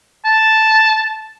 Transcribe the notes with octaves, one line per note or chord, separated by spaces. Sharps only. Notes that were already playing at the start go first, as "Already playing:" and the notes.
A5